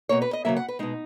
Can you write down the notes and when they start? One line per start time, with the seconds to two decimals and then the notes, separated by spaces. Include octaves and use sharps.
0.09 B2 A#3 C#5
0.22 B4
0.33 D#5
0.45 C#3 F#3 A#3 E5
0.57 F#5
0.68 B4
0.79 B2 G#3 D#4